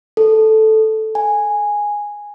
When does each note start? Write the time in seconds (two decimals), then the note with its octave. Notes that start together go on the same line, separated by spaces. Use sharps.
0.17 A4
1.15 G#5